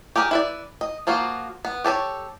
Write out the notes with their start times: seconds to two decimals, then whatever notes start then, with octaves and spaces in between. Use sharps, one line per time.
0.16 G4 G#4 A#4 G5
0.31 E4 B4 D5
0.81 D#5
1.07 F3 A#3 F4 F#4
1.65 B3
1.84 G4 A4 B4 C#5